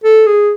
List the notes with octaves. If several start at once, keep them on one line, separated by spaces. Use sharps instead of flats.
A4
G#4